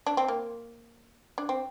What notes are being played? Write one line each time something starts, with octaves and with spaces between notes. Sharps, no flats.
D4
C4
A#3
D4
C4